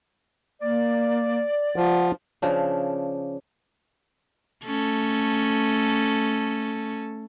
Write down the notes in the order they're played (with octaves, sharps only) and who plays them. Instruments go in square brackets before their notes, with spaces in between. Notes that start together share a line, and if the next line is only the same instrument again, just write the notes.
[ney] A#3 [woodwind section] D5
[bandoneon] F3 [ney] F#5
[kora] C#3 F3 D4
[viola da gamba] A3 C#4 A4